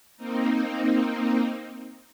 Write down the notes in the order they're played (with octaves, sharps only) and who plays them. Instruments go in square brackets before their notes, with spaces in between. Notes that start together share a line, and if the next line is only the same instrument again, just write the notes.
[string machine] A#3 C4 D#4